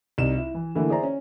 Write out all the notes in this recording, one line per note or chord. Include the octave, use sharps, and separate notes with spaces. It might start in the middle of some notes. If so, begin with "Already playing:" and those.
C2 G3 D#4 E7
E4
E3
D3 E3 A3 A#3 E4
G#4 C5 D5 E5 A#5
C#4